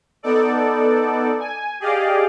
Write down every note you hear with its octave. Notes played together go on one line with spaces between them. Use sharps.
B3 D#4 A4 D5
G#5
G4 G#4 D5 D#5 F5